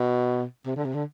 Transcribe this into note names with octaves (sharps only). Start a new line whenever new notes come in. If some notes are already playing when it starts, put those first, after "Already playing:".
Already playing: B2
C3
D3
C3
D3